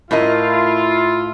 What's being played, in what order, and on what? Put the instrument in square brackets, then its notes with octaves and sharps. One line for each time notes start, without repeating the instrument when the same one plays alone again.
[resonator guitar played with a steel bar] A2 A#4 D#5 [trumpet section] E4 F4